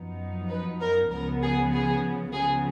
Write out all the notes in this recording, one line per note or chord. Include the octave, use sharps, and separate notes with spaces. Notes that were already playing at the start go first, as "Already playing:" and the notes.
Already playing: F#2 F3 B3 D#4
B4
A#4
C#2 C#3 F3 B3 A#4
G#4
G#4
C#3 F3 B3 G#4